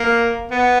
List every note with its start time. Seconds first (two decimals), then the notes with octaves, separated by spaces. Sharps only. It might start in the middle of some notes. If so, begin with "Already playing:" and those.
Already playing: A#3
0.52 B3